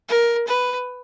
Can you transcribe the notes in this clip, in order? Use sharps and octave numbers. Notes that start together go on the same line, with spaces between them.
A#4
B4